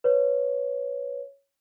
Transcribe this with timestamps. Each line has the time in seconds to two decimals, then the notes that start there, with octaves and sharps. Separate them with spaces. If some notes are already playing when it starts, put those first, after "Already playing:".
0.04 B4 C#5